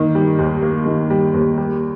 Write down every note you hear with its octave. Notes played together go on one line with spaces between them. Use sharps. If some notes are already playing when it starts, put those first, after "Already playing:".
Already playing: D#3 A#3
G3
D#2
A#3
D#3
G3
D#2
G3